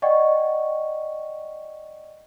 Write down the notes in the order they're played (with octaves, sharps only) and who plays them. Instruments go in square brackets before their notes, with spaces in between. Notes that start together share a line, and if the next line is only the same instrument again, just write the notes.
[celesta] D5 D#5 F#5 G5 C#6